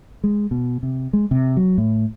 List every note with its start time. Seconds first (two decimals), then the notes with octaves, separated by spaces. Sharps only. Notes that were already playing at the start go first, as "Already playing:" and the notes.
0.24 G#3
0.51 B2
0.83 C3
1.13 G#3
1.31 C3
1.57 F#3
1.78 A2